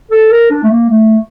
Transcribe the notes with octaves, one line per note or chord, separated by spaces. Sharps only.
A4
A#4
D4
A3
A#3
A3